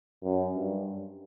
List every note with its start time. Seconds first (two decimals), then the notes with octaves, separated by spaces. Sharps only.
0.24 F#2
0.55 G2